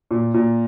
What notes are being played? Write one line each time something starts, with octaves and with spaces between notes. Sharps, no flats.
A#2
A#2